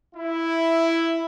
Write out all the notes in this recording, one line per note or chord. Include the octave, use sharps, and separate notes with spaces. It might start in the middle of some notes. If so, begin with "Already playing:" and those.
E4